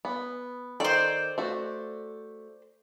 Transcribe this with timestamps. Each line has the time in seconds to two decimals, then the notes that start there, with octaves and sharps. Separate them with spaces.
0.05 B3
0.80 D#3 A4 C5 D5
1.38 A3 F#4